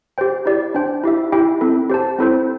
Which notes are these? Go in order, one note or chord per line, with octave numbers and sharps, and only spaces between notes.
G4 C5 G5
E4 G4 D5
D4 C5 G5
E4 G4 E5
E4 G4 E5 G5
C4 E4 A4
G4 C5 A5
C4 E4 A4 C5